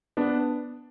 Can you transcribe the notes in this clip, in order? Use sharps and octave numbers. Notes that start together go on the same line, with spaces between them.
B3 D4